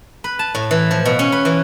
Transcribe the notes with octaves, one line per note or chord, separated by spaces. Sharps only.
B4
A5
A2
E3
F3
B2
C#4
B4
E3